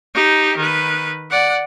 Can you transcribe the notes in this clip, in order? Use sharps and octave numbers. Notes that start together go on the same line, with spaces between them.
D#4 G4
D#3 B4
D5 F#5